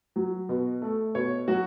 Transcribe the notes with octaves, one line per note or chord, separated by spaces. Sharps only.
F#3
B2
A3
B2 C#5
F#3 F#4